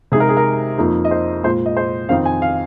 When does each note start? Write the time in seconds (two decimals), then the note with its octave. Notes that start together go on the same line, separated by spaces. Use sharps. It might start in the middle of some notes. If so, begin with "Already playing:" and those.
0.12 C3 G#3 D#4 G#4
0.20 A#4
0.29 G#4
0.37 A#4
0.78 F2 F3 A#3 D#4
1.05 D#5
1.11 C5
1.44 A#2 G#3 F4 C5
1.66 D#5
1.77 C5
2.09 F2 D#3 C4 D#4 F5
2.25 G#5
2.42 F5